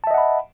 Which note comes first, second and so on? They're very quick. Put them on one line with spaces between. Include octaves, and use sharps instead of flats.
A5 E5 D#5 F#5 B5